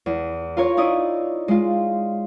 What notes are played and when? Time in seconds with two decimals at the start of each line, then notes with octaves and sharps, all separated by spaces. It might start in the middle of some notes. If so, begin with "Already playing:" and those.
0.06 E2
0.57 F4 A#4 C#5
0.77 D#4 E4 D5 D#6
1.48 G#3 F4